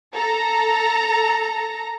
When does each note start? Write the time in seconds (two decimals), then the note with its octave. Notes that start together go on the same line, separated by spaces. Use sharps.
0.15 A4 A#5